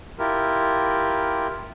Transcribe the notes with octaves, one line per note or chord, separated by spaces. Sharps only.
E4 F4 G4 A#4